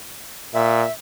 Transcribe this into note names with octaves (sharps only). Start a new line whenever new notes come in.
A#2 E5